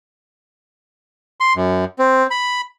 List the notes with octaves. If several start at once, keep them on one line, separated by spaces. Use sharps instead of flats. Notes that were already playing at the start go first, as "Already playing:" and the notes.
C6
F#2
C4
B5